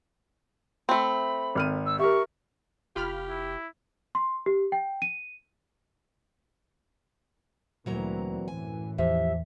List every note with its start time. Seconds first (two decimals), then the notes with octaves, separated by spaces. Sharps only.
0.89 A3 C4 B5
1.55 G#1 F6 D#7
1.86 E6
2.00 G4 A#4 E5 C#6
2.96 F1 F4 G4 B5 F6
3.29 E4
4.15 C6
4.46 G4
4.72 G5
5.02 D#7
7.86 D2 A#2 E3 F#3 C4 A#5
8.48 F#2 A2 E3 G#5
8.98 E2 F3 G4 E5